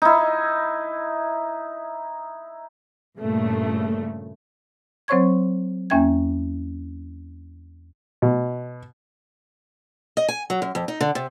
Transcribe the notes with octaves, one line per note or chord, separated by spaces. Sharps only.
D#4 E4
G2 A#2 C#3 A3
F#3 C4 C5 C#5 C#6 G#6
E2 A#3 C#4 E5 G5 G#6
B2
D#5
G#5
F#3
F#2
F2
D#4
D3
C3